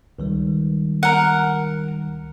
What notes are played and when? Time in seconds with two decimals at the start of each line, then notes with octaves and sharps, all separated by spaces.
0.19 C#2 D#3 G3
1.03 A#4 F#5